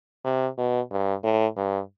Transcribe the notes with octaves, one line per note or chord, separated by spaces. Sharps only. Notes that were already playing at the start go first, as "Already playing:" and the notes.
C3
B2
G2
A2
G2